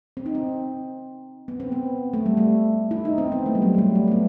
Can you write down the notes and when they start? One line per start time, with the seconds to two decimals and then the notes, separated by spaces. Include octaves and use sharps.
0.17 C4
0.26 D#4
0.35 C4
1.48 B3
1.60 C4
1.72 B3
2.13 A3
2.26 G3
2.37 A3
2.91 E4
3.05 D#4
3.18 C4
3.32 B3
3.46 A3
3.55 G3
3.62 F#3
3.75 A3
3.78 G3
3.95 A3
4.08 A3
4.12 B3